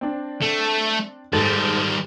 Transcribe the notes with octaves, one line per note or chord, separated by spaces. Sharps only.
C4 D4
A3
G#2 D#3 G3 A4 A6